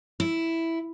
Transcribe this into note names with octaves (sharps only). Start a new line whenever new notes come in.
E4